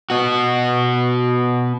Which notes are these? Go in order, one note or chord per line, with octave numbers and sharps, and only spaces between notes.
B3 F#4